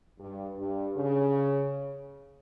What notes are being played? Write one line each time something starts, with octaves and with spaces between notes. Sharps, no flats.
G2
G2
C#3